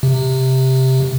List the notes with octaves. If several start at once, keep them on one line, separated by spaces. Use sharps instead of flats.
C3